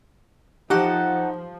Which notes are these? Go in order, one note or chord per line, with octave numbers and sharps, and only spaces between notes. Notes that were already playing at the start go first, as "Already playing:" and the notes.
F3 D#4 F#4 G4 A4 F#5